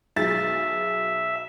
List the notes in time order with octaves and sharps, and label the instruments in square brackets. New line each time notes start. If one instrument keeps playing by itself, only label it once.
[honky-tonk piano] B1 G#4 A6 [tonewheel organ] E5